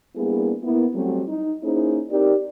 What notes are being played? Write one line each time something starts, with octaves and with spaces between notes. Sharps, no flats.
G3 A#3 B3 D4 E4 G#4
A#3 B3 E4
F#3 G3 A3 C4 F#4
D#4
A#3 C#4 D#4 E4 G#4 C5
C4 D#4 G4 A#4 D5